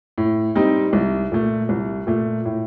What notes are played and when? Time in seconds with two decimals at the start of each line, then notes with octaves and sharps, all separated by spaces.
0.18 A2
0.55 G3 C4 D#4
0.93 C2
1.32 A#2 A3
1.69 C2
2.07 A#2 A3
2.45 A2